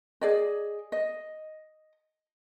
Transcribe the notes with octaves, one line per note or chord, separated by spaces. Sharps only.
G#4 D5 D#5
D#5